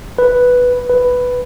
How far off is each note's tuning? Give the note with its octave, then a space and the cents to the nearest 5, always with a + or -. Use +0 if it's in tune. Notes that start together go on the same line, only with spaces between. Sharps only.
B4 +0
B4 +5